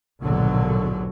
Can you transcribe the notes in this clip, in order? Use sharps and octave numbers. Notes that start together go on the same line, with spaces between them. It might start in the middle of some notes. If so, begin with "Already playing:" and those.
A#1 D#2 G#2 B2 D3 F#3